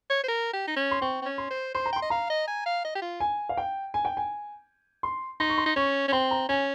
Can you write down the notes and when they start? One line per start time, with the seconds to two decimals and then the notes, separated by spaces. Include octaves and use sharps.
0.10 C#5
0.23 C5
0.28 A#4
0.53 G4
0.68 D#4
0.77 C#4
0.91 C6
1.01 C4 C#6
1.22 C4
1.25 C#4
1.38 C6
1.50 C5
1.74 C5 C6
1.86 A#5
1.93 G5 C6
2.02 D#5
2.10 F5 A#5
2.30 D#5
2.47 G#5
2.66 F5
2.84 D#5
2.95 G4
3.02 F4
3.20 G#5
3.49 F5
3.57 G5
3.94 G#5
4.05 G5
4.17 G#5
5.03 C6
5.40 D#4 C6
5.49 C#6
5.58 C6
5.66 D#4
5.76 C#4 C#6
6.08 C#4
6.12 C4 C6
6.31 A#5
6.49 C#4 G#5